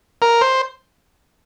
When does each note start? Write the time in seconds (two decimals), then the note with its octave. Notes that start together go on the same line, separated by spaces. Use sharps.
0.22 A#4
0.41 C5